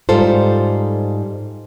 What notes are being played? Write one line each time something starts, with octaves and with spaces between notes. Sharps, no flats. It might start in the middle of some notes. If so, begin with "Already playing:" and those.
G#2 G3 F4 A4 C5